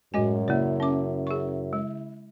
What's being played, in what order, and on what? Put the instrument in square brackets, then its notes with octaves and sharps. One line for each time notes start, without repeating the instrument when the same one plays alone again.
[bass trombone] F#2 [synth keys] A2 G#3 [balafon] F#4 D#5 G#5
[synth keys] C#3 E4 E5 [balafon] A#3 D5
[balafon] C#4 D6
G#4 C#6
G#3